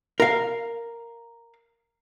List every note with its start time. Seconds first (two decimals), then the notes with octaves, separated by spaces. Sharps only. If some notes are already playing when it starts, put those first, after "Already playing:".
0.20 A#4 F5